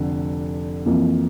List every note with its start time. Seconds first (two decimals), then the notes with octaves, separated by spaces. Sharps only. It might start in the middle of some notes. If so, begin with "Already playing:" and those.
Already playing: F1 D3
0.86 F2 E3 A#3